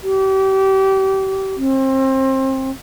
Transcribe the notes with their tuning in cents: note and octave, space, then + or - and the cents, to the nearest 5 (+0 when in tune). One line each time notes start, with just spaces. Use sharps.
G4 -30
C4 +30